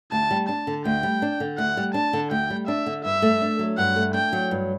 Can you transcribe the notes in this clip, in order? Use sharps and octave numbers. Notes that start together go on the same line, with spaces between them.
D2 A5
G3
D4 A5
D3
D2 G5
G3
D4
D3
D2 F#5
G3
D4 A5
D3
D2 G5
G3
D4 E5
D3
G2 E5
A3
D4
F#3
G2 F#5
A3
D4 G5
F#3
G2